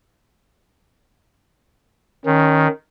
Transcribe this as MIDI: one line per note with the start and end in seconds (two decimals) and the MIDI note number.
2.25 2.67 51
2.25 2.70 61